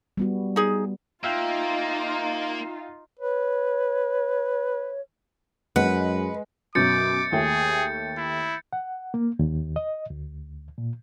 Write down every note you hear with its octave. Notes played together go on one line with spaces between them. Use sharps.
G3 B3 F#4
D#4 G#4
A#3 D#4 F4 E5 F5 G5
B4 C#5
F#2 G#3 B4 F#5
F#2 B2 F#3 D6 G6 A6 C#7
D#2 A3 G#4 G5
E4
F#5
A#3
D#2
D#5
D2
A#2